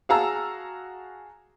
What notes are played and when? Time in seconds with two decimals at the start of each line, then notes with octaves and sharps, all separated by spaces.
0.09 F#4 G#4 F5 A5 A#5 E6